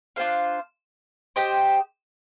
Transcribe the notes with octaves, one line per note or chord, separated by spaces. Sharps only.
D4 F4 C5 F5
G4 C5 D#5 G5